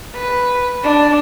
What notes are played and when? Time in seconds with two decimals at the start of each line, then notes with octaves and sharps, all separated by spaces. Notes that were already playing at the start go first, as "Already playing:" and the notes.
0.16 B4
0.83 D4